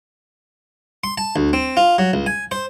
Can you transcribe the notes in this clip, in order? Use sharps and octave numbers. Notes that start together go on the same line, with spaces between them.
C6
A5
D2
C4
F4
F#3
C#2
G#5
C5